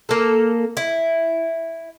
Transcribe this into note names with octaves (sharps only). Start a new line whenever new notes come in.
A#3 A4
E4